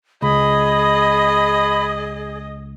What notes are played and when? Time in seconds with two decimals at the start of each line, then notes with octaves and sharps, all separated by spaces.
0.22 C#2 G#4 D#5 B5